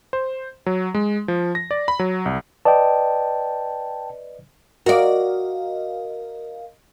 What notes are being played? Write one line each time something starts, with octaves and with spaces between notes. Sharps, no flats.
C5
F#3
G#3
F3
A#6
D5
B5
F#3
C2
B4 D5 D#5 G5 A5
F#4 A#4 D5 D#5 F5